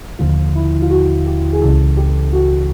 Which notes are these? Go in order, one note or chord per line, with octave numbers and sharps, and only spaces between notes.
D#2 D3 F3 F4
E4
F4
F#4
G4
G#4
C#2 C#3 E3 A4
G4
F#4